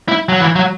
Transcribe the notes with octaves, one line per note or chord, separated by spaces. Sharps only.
E4
F#3
E3
F#3